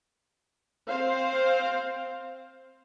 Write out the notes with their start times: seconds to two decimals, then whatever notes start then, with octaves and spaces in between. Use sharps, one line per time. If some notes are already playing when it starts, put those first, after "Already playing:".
0.87 C4 C5 F5